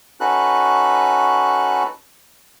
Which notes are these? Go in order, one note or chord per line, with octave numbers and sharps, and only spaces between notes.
C#4 D#4 F#4 A4 B4 F#6